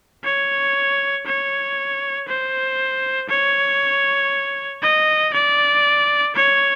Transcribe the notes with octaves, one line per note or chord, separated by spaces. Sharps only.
C#5
C#5
C5
C#5
D#5
D5
C#5